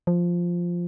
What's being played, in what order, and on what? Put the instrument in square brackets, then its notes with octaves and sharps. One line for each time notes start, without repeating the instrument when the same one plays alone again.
[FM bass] F3